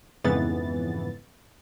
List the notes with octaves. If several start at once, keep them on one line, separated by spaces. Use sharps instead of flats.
F2 G#2 C#3 E3 B3 A6